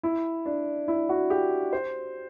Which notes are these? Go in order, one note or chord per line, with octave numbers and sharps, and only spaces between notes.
E4
D4
E4
F#4
G4
C5